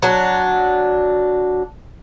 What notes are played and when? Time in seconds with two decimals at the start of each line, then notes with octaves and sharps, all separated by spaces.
0.02 F#3 D4